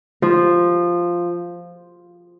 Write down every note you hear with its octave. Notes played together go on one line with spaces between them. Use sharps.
F3